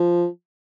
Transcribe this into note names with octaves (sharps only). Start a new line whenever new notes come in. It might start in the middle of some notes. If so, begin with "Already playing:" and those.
Already playing: F3